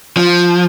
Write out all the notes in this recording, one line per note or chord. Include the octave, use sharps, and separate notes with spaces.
F3